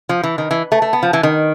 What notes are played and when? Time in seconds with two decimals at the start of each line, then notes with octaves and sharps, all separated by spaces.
0.09 F3
0.23 E3
0.38 D#3
0.51 E3
0.72 A3
0.82 A3
0.93 B3
1.03 F3
1.13 E3
1.23 D#3